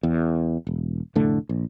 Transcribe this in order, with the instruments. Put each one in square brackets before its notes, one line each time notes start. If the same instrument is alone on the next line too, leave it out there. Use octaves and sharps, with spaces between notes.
[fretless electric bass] E2
E1
F1 A2 D3 A3
A#1